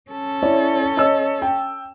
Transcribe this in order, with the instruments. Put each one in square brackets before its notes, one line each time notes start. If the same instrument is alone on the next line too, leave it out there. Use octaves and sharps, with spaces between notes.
[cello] C#4 A4
[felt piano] E4 C#5 D5
C#5 D#5 E6
G5